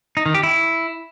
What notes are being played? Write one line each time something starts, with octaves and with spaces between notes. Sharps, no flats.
D#4
D#3
G4
E4